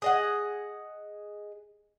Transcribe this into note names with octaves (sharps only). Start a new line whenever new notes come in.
G#4 D#5 F#5